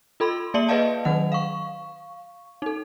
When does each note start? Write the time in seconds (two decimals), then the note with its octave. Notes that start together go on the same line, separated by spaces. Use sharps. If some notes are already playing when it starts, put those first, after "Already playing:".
0.20 F4 A4 B5 C6
0.54 A#3 D5 E5 F#7
0.68 G#4 B4 D5 D#5 F5 A5
1.05 D#3 F#3 F#5
1.32 F5 C#6
2.62 D#4 A4